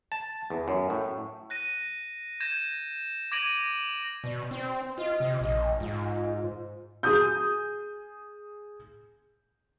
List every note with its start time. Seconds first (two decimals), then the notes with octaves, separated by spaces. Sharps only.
0.12 A5
0.50 E2
0.68 F#2
0.90 A2
1.50 F#6 A#6 D#7
2.40 G6 G#6 A#6 E7
3.32 D6 G#6 A#6 D7 D#7 F#7
4.24 B2 D5
4.51 C4 C5
4.98 F4 D#5
5.20 C3
5.41 A#1 D#5
5.80 G#2 F4
7.03 G#4 D#6 G6